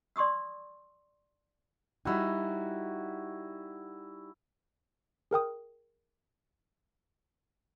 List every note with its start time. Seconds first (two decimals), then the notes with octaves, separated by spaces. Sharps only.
0.16 D5 C6 C#6 D#6 E6
2.05 G3 D#4 E4 F#4 G#5
5.31 G#4 A#4 G5 D#6